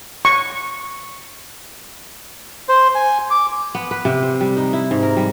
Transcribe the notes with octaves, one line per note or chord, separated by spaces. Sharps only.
C#6
C5
G#5
D6
B3
B4
C3
C5
G3
D#4
E4
G#2
A#4
G3